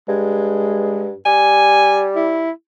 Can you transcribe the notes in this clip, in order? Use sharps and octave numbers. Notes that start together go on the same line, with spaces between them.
G2 G#3
G3 G#5
E4